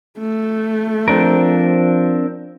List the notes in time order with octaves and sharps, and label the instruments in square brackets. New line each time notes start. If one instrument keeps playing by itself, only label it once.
[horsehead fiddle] A3
[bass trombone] F3 [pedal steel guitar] C4 D4 A#4